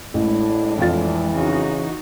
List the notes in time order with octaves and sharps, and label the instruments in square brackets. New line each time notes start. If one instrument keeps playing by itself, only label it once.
[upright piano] A1 [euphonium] A2 [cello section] G#3 D4 [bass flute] E4
[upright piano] F2 F4 A6 [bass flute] E3
[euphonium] C#3 [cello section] D#4 F#4